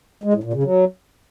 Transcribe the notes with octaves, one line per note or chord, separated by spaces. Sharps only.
G#3
A2
A#2
C#3
F#3